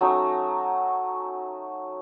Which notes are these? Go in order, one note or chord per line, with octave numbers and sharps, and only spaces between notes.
F#3 A3 C#4 D#4